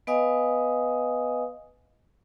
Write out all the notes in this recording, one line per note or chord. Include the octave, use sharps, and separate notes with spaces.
B3 B4 D#5 F5 G#5 D#6